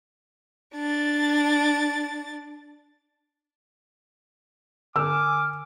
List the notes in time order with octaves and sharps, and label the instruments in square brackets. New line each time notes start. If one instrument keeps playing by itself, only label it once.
[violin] D4 A6
[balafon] D3 [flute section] G#5 F6 [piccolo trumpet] D6 [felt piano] E6